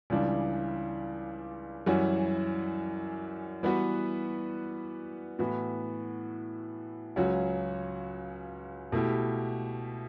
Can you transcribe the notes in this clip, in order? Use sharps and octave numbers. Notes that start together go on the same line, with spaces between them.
C#2 C#3 E3 G3 D4
F#2 E3 G3 C#4 F#4
E3 G3 B3 F#4 B4
A2 E3 B3 F#4
C#2 C#3 F#3 C#4 F#4
B2 A3 E4 G4